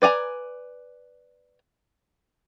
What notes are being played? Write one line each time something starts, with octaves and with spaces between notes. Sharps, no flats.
B4 D5 G#5 A#5